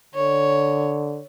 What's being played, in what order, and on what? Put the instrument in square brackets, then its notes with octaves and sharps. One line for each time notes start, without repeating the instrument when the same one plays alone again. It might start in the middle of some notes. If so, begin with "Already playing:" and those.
[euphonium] D3 [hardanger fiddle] C#5